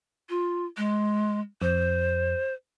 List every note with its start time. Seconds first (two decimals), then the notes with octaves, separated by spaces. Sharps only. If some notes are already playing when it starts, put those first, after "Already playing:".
0.30 F4
0.77 G#3
1.62 F2 C5